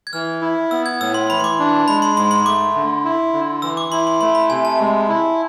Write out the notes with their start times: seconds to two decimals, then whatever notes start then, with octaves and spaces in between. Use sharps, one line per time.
0.07 G#6
0.13 E3 F6
0.42 E4
0.71 B3 E6
0.86 G#6
1.01 A2 E6
1.14 C6
1.30 E3 B5
1.40 C6
1.44 D6
1.59 D4
1.88 G#3 B5
2.02 C6
2.17 G#2 C6
2.31 C6
2.46 A3 D6
2.75 D3
3.04 E4
3.33 D3
3.62 E3 E6
3.77 D6
3.92 E4 C6
4.07 C6
4.21 A3 C6
4.35 B5
4.49 C3 G#5
4.65 A5
4.79 G#3
5.09 E4